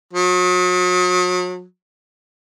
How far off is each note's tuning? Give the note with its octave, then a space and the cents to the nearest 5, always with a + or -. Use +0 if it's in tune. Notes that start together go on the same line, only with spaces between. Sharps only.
F#3 -40